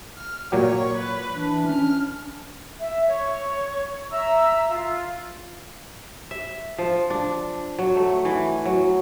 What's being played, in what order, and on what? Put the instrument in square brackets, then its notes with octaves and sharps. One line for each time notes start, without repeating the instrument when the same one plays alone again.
[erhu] F6
[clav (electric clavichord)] A#2 F#3 G4 [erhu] C#5
[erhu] B4
[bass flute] E3 [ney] D4
[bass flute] C#4 [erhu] F6
[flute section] E5
C#5 C#6
E5 A#5 E6
F4
[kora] E5
F3
D4
F#3
A3
E3
F#3